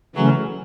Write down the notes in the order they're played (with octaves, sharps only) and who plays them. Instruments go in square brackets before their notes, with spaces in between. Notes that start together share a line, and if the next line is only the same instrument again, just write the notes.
[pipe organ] C#3 E3 A3 C#4 [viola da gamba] F#3